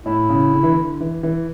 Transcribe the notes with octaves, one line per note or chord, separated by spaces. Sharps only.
A2 E4
C#3
D3
E3
D3
E3
E3